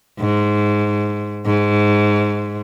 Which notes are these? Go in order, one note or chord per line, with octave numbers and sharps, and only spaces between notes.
G#2
G#2